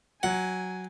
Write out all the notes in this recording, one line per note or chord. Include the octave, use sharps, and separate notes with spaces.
F#3 F#5 G#5